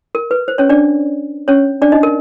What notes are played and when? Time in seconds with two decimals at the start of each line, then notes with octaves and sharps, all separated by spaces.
0.15 A#4
0.31 B4
0.48 C5
0.58 C#4 C#5
0.69 D4 D5
1.48 C#4 C#5
1.82 D4 D5
1.92 D#4 D#5
2.03 A#4